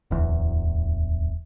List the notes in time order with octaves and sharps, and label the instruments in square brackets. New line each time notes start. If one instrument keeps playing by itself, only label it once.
[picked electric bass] D1 E2